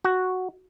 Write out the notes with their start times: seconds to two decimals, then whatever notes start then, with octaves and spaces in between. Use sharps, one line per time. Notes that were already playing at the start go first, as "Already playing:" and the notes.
0.04 F#4